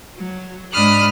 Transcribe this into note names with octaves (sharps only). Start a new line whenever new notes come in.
F#3
G#2 D4 B5 D#6 F6 F#6